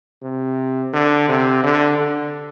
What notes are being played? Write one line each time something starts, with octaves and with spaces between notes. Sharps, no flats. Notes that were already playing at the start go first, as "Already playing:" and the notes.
C3
D3
C3
D3
D3